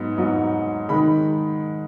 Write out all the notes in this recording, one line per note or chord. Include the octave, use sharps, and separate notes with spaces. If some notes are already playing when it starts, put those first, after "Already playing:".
Already playing: G#2 F#3 B3 D#4
G#2 F#3 B3 D#4
D#3 G#3 D#4 B5